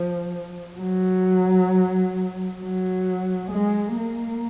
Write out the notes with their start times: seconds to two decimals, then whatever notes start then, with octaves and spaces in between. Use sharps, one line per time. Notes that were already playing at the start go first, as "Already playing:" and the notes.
Already playing: F3
0.78 F#3
2.61 F#3
3.51 G#3
3.96 A#3